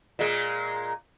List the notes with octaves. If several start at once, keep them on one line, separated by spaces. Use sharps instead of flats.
A#2 G#3